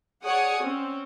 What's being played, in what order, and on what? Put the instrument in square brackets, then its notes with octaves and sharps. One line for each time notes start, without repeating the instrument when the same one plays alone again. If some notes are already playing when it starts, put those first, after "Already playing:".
[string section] G#4 C#5 D5 F#5 G#5 D#6
C4 C#4